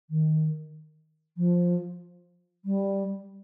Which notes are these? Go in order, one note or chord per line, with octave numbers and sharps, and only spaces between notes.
D#3
F3
G3